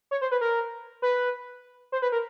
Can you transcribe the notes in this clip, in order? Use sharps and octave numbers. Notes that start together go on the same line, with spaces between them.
C#5
C5
B4
A#4
B4
C5
B4
A#4